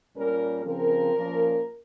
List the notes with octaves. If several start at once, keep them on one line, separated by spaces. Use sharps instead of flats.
A#2 G3 C#4 A#4
C#3 F3 C4 A#4
A#2 F3 A#3 C#4